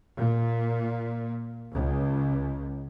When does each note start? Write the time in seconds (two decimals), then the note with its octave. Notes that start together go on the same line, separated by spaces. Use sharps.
0.19 A#2
1.73 C#2